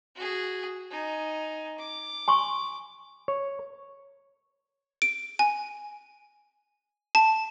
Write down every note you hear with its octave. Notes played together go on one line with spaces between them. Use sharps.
F#4 G#4
D#4 G#5
D6
G#5 C6 C#6
C#5
D7
G#5
A5